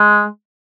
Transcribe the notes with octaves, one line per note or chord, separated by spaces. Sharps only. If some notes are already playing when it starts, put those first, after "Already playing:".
Already playing: G#3